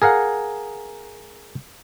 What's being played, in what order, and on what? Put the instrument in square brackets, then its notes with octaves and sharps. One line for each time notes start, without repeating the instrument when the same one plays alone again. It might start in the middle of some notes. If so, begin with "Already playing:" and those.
[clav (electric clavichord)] G#4 A#4 F5 F#5